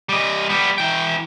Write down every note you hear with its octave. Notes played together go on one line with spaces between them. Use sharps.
G3 D#5
G3 B3
E3 G5